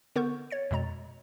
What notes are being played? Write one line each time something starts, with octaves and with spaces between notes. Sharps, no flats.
D3 B3 A#4 C#6 G6
C#5 A6 C#7
F2 B2 G#3 A#5 A6